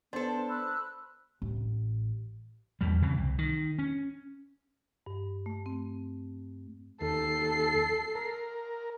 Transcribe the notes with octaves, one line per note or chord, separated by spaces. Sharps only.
B3 D4 A4 C5
B5 E6 F#6
A1
E2 G3
E2 C#3 E3 C4
C2
D#3
C#4
G2
A3
C4
D#2 A4 C7
A#4